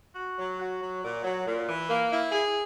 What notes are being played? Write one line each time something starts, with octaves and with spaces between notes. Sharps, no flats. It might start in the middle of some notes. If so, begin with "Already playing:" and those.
F#4
F#3
F#4
F#3
A#2
F#3
A#2
E3
A#3
E4
G#4